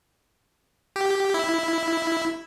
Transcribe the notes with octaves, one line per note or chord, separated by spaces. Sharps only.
G4
E4